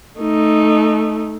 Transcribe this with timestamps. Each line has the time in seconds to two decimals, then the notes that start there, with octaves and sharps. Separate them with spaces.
0.20 A3 D#4